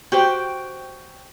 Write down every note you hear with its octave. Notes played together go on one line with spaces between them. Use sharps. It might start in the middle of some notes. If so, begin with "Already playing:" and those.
F#4 G4 C5 G5